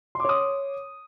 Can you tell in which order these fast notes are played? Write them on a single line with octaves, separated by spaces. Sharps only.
C6 D6 C#5 D#6